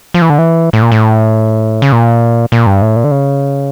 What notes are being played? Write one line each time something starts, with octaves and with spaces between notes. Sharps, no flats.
F3
E3
D3
E3
A2
A#2
A2
C#3
A#2
A#2
G2
A2
A#2
D3
C#3